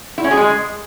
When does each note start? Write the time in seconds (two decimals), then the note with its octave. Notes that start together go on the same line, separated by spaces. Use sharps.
0.18 E4
0.24 C#4
0.31 G#4
0.37 G#3